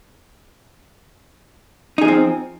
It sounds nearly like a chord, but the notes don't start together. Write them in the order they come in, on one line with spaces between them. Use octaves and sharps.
D#4 G#4 F3 C4